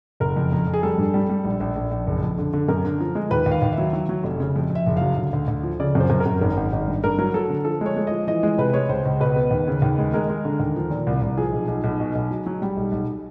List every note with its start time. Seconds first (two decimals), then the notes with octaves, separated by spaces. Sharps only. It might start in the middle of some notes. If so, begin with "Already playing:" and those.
0.20 F#1 A#4
0.36 F2
0.52 F2
0.67 F2
0.73 G#4
0.83 G3 A4
0.98 G2
1.14 G3
1.29 G3
1.45 A#1
1.60 A#1
1.76 A#1
1.91 A#1
2.07 F#1
2.22 F2
2.38 D3
2.53 D3
2.68 F#2 A#4
2.85 D3
3.00 F3
3.15 G#3
3.31 D#2 B4
3.46 D#2
3.51 F5
3.62 D#2
3.73 E5
3.78 F#3
3.93 F#3
4.09 F#3
4.24 F1
4.40 C#3
4.56 F2
4.70 F2
4.75 E5
4.86 F#1
4.97 F#3 F5
5.17 D2
5.33 D2
5.48 D2
5.63 F3
5.80 C#3 D5
5.95 F#2 C5
6.10 F#2
6.20 A#4
6.26 F#2
6.41 G#1 A#4
6.57 G#1
6.72 G#1
6.88 G2
7.04 G2 A#4
7.18 F#3 A#4
7.34 F#3 A4
7.50 D3
7.65 F3 A4
7.81 G#3 C#5
7.97 G#3
8.07 F3 D#5
8.27 E3 D#5
8.43 G#3
8.58 C3 B4
8.73 G#3 C#5
8.89 C#2 C5
9.06 C#2
9.20 B2 B4
9.36 B3
9.51 D#2
9.67 C#3
9.82 D#2
9.99 G#3
10.14 G#3 A#4
10.30 G#3
10.45 D3
10.60 D#2
10.76 F3
10.91 A#2
11.07 C2
11.22 C2
11.37 F3 G#4
11.52 B1
11.68 B1
11.84 B1
12.00 B2
12.15 B1
12.31 F#3
12.46 F#3
12.62 G3
12.77 B1
12.92 B1